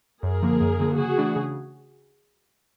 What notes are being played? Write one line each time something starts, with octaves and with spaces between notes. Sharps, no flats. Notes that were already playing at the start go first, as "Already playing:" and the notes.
F#2 G#4 A#4
D3 F3 A#3
F#2
D3 F3 A#3
C#3 F#4 G#4
E3 A3 D4
C#3